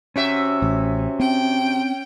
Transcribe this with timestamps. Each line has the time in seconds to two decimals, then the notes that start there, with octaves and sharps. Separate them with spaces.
0.16 C3 C#4 F#4 E5
0.62 A1
1.20 C4 G5